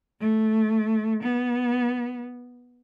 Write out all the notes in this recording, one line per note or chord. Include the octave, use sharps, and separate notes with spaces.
A3
B3